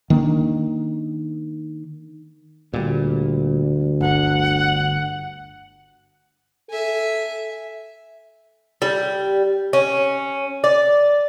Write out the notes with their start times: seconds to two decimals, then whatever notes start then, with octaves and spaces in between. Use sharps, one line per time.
0.10 D#3 A#3 D4
2.73 D2 A#2 G3
4.01 G1 D3 F#5
6.70 A4 E5 G#5
8.82 G3
9.73 C#4
10.64 D5